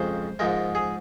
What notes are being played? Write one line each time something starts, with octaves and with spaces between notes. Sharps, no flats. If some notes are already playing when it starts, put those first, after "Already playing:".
Already playing: F2 C#3 F3 G#3 C5
G#2 F3 G#3 A#4
G#4